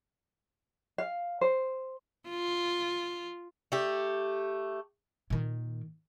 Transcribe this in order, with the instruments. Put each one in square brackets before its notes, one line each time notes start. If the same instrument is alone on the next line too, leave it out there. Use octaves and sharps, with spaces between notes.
[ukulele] F5
C5
[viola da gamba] F4
[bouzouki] A3 G4
[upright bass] A#2 D#3